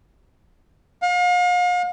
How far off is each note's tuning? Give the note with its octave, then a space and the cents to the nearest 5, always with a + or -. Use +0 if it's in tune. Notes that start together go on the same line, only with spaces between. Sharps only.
F5 +40